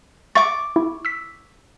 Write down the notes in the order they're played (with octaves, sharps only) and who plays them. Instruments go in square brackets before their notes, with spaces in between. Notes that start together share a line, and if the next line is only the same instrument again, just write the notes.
[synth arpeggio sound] E5 A6 [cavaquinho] C#6 D6
[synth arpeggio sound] E4
E6 B6